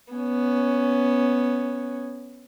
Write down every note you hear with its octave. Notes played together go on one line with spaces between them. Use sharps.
B3 C#4